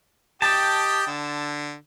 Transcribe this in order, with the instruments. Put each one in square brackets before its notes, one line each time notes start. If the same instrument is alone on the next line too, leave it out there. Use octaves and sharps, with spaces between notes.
[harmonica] G4 D#5 G5 [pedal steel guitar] A5
[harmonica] D3